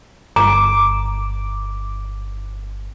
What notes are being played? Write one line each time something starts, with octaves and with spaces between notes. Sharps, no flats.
G1 A#5 D6